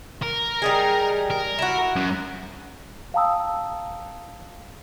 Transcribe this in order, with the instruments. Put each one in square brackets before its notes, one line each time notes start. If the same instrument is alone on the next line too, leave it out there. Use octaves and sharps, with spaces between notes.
[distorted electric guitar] A#4
[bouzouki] G3 D#4 G#4
[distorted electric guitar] A#4
[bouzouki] E4 F#4
[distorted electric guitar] F#2
[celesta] F5 G5 A5 A#5 D#6 E6